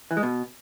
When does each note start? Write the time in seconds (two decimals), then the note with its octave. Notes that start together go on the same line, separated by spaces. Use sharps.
0.11 E3
0.17 G#3
0.23 B2